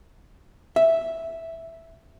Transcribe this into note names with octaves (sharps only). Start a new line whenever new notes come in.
E5